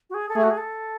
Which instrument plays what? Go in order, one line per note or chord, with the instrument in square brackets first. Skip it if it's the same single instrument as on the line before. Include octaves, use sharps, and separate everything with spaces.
[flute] F#4
G#4
A4
[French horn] A3 [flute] G#4
[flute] F#4
G#4
A4